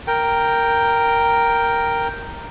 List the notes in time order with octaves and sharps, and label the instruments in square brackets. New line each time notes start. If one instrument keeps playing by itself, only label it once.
[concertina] A#4 G5